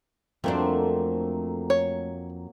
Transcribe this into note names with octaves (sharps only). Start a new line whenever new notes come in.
F2 F#3 A3 A#3 C4 D4
C#5